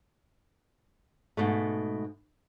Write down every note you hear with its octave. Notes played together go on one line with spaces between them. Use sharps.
G#2 B2 A3